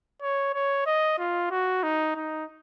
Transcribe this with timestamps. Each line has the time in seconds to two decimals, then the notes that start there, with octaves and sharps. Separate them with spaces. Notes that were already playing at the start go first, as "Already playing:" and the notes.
0.22 C#5
0.54 C#5
0.86 D#5
1.19 F4
1.51 F#4
1.83 D#4
2.15 D#4